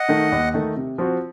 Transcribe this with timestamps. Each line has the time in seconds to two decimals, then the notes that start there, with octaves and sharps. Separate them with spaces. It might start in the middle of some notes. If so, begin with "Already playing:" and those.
Already playing: D#5 F#5
0.09 D#3 A3 D#4
0.32 D#2
0.54 D#3 A3 D#4
0.76 C3
0.98 F3 C4 F#4